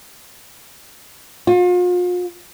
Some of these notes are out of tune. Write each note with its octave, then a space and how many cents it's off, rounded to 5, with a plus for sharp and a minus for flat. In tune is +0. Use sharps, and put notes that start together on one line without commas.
F4 +40